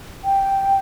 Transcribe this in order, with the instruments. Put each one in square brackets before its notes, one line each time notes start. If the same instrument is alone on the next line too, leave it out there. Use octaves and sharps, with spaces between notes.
[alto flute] G5